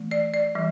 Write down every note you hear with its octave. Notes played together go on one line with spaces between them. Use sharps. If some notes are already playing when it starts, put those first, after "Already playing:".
Already playing: E3 A3
D5
D5
E3 G3